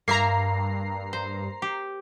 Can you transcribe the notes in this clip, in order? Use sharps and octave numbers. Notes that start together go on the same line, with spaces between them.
G2 A#3 E5 A#5 C7
C5
G4